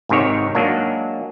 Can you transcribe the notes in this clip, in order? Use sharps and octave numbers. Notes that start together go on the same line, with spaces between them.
G#1 G#2 C3 D#3 C#5
F#3 G#3 A#3 D4